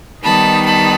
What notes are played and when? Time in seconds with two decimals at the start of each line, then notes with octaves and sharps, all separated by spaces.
0.23 D#3 G3 B3 D#4 A5 B5
0.64 A5 B5